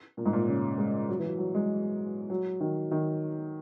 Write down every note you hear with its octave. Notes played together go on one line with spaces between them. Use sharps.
A#2
G#2
A#2
C#3
G#3
F#3
E3
F#3
F#3
G#3
F#3
D#3
D#3